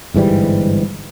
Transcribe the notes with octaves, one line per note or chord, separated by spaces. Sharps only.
G1 G#2 E3 G3